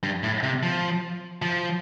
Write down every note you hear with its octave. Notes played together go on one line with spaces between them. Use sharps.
G2
A2
C3
F3
F3